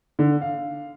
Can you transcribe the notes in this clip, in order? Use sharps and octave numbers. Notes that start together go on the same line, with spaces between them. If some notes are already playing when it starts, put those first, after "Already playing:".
D3
F5